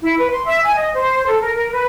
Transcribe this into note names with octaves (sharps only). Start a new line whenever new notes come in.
E4
B4
C6
E5
G#5
D#5
C5
A4
A#4
A#4
B4